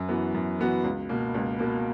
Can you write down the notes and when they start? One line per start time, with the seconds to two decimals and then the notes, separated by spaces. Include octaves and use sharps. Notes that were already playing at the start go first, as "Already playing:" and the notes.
Already playing: F#2
0.08 E3 B3 F#4
0.34 F#2
0.59 E3 B3 F#4
0.84 C#2
1.09 B2 A#3
1.34 C#2
1.59 B2 A#3